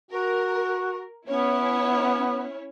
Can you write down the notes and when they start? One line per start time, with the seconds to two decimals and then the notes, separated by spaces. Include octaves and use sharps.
0.11 F#4 A#4
1.28 B3 C#4 E4 C#5